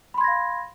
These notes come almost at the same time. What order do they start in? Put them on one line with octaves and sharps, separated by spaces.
B5 C6 G#6 A#6 F5